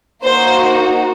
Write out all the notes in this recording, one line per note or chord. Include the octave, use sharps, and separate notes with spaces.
A#3 D#4 F#4 C5